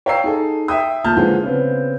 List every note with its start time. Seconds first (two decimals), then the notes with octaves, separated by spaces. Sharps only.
0.06 C#5 F5 G5 A#5 E6 C7
0.24 D#4 G#4 A4
0.68 E5 G5 D#6
1.04 D#1 A#2 A5 F6 G6
1.17 A#2 D3 E3 F3 G#3 G#4
1.43 C#3 B3 C4